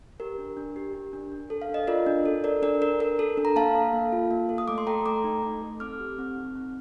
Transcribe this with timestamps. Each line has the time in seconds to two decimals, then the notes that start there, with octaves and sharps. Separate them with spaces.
0.20 G4 A#4
0.38 D4
0.57 D4
0.76 G4
0.95 G4
1.13 D4
1.32 D4
1.50 A4
1.62 F5
1.69 D4
1.74 D#5
1.87 F4 A#4 D5
2.06 D4
2.26 A4
2.44 A4 A#4 D5
2.62 D4 A#4 D5
2.81 D4 A#4
3.00 A4 A#4
3.19 A4
3.37 D4
3.45 A#5
3.56 A#3 F5 A5
3.75 A4
3.93 A#3
4.12 F4
4.31 A#3
4.49 A4
4.58 D#6
4.68 A3 D6
4.78 C6
4.87 A4 G5 A#5
5.06 A3 A#5 D6
5.24 D#4
5.43 A3
5.62 A4
5.80 C4 D6 F6
6.00 G4
6.18 C4
6.37 D#4
6.55 C4